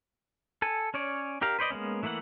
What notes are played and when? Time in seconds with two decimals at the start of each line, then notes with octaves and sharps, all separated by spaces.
0.62 A4 G#5
0.94 C#4 C#5 D5
1.41 D4 G4 A#4 F5
1.59 B4 C5 D5 D#5
1.70 G#3 A#3 B3 C#4
2.03 E3 A3 A#3 E4 F#5